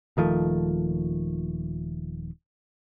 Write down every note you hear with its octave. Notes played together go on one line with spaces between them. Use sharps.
D#1 D#3 F3 A3